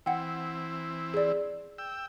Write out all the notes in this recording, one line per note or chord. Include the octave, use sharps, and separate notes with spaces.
E3 C4 E4 F#5 G5
G#4 D5
G5 E6